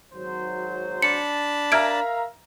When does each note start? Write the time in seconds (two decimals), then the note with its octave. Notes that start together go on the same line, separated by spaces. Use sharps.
0.13 G#1 F#3 C5
1.02 D4 A5 B5 C#7
1.72 A#4 E5 F5 A#5 F6 G#6 D7